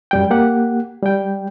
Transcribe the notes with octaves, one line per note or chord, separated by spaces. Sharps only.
F#2 G3 G5
A#3 G4 F#5
G3 G5